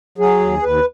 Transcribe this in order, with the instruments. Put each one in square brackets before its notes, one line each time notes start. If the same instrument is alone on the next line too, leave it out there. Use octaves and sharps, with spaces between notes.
[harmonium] F#3 G#4
D#2
D#2 B4